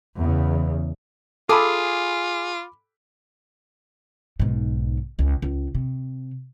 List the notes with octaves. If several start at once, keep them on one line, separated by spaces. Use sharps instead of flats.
E2 C#3
F4 G#4 A4 B5 D6
B1 G#2
C#2
C#2
C3